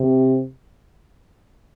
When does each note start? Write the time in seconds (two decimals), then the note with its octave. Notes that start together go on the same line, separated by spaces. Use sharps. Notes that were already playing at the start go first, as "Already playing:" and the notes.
Already playing: C3